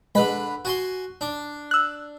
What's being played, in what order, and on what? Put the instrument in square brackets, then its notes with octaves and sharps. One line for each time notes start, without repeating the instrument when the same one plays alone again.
[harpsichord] D3 B4 B5 [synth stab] G#3
[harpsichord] F#4 G#5 C6
D4
[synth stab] E6 F#6